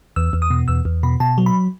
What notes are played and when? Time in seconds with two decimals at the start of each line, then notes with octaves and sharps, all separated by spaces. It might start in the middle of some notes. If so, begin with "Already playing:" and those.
0.16 E2 E6
0.33 E2
0.42 D#6
0.50 B2
0.68 E2 E6
0.85 E2
1.03 B2 B5
1.20 B2 A5
1.38 F#3
1.46 B5